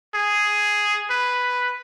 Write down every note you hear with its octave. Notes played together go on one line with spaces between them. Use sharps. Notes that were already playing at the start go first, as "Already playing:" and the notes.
G#4
B4